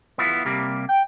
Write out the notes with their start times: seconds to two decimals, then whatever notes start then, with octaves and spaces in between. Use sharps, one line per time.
0.18 B3 E4 F4
0.46 C3 G3 A#3
0.89 G5